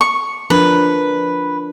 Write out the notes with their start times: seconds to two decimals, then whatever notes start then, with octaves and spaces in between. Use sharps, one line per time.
0.01 C#6
0.50 F3 D4 A#4 B4